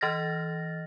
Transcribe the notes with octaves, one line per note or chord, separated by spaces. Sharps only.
E3 D#5 F6 A6 A#6